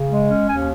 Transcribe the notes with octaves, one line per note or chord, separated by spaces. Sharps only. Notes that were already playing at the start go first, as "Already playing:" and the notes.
Already playing: C#3
G#3
C#4
D#2 G#5